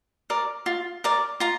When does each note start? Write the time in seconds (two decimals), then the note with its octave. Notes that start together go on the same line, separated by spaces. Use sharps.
0.30 A#4 D5
0.66 F4
1.04 A#4 D5
1.40 F4 A#5